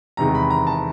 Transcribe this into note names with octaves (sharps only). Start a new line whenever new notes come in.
E2 C3 D#3 G#3 A#5
B5
A#5
A5